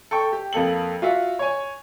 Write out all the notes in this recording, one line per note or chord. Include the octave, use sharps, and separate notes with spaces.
A4 G5 C#6
G4
F2 A#3 A4 F#7
F4 F#4 E5
C#5 G#5